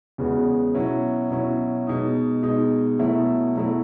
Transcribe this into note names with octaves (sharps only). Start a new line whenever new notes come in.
E2 C#3 G#3 B3 F#4
B2 F#3 C#4 E4
B2 F#3 C#4 E4
B2 G#3 D#4
B2 G#3 D#4
B2 F#3 A3 E4
B2 F#3 A3 E4